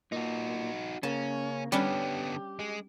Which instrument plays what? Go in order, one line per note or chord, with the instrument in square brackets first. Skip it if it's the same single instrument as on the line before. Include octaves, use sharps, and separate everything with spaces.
[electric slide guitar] A#2 [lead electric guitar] D#4 F#4
[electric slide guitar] C#3 A#3 [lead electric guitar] C#4 [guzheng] A5
[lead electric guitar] D3 B3 [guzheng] G3 C#4 D4 [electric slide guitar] G4
[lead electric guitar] G#3